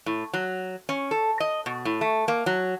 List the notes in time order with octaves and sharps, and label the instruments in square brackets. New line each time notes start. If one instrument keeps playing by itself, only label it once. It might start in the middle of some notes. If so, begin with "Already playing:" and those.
[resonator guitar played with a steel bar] A2
F#3
C#4
A4
D#5
B2
A2
A3
A#3
F#3